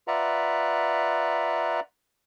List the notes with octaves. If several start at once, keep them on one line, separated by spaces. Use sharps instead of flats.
F4 B4 D5 E5 F#5 A#5